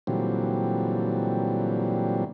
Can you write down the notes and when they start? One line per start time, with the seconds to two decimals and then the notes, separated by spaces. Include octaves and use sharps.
0.07 A#2 D3 E3 F#3 G3 C4